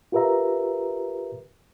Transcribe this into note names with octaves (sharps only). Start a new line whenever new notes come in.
F4 G4 A#4 B4 E5 A#5